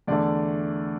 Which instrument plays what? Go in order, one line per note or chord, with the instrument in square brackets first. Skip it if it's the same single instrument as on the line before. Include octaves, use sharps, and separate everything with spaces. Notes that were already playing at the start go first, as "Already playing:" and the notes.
[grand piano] E2 D3 A3 D5